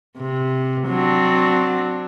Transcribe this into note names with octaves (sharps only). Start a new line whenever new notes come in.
C3
F#3 C4 D4